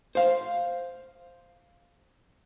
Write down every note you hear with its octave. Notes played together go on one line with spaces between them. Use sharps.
C5 F5